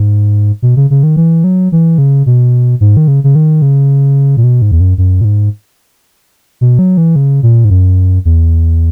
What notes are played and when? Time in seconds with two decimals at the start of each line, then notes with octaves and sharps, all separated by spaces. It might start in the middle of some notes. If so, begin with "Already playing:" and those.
Already playing: G#2
0.62 B2
0.76 C#3
0.90 C#3
1.03 D#3
1.16 E3
1.44 F#3
1.72 E3
1.98 C#3
2.26 B2
2.81 G#2
2.97 D#3
3.08 C#3
3.24 C#3
3.35 D#3
3.62 C#3
4.37 A#2
4.44 B2
4.62 G#2
4.71 E2
4.80 F#2
4.98 F#2
5.21 A#2
5.25 G#2
6.61 B2
6.79 F#3
6.97 E3
7.16 C#3
7.43 A#2
7.65 G#2
7.70 F#2
8.25 E2